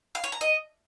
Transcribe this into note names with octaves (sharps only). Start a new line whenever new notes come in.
F5
C#5
A#5
D#5